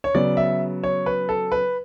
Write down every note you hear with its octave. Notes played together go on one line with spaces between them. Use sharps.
C#5
C#3 F#3 B3 D5
E5
C#5
B4
A4
B4